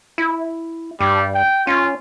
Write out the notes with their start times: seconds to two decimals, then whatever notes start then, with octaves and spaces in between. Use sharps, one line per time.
0.18 E4
1.00 G2 G3
1.34 G5
1.67 C#4 F4